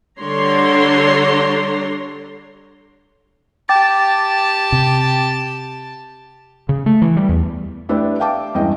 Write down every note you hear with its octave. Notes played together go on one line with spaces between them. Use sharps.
D3 G3 D4 C#5 A#5 C6
G4 G5 A5 D6 A6
C3
C#3
A3
E3
G3
E2
A3 D4 E4 G4 B4 D5
E5 F5 G5 A5 D6
E2 G2 G#3 C#4 D#5 G5